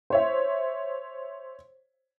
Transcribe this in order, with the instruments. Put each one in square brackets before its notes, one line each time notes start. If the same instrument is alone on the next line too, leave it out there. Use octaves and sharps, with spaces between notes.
[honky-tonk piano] C5 C#5 E5